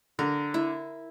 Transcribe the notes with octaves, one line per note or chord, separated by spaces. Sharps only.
D3 A#4
E4